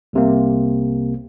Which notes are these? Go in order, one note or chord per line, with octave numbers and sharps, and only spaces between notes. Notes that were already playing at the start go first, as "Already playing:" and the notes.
C2 C3 A#3